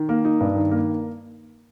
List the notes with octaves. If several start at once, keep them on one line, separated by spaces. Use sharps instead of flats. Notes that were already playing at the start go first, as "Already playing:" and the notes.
Already playing: D#3
A#3
D#4
G2
D#3
A#3